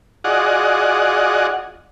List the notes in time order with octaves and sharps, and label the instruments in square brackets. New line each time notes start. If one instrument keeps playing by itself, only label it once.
[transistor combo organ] F4 F#4 G#4 D5 D#5 F#5